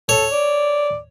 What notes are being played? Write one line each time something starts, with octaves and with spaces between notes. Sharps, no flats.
A4 C#5
D5